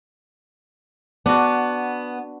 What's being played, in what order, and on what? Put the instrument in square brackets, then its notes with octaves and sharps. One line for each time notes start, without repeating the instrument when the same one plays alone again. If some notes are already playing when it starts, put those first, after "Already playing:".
[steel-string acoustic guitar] B3 [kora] D4 F#4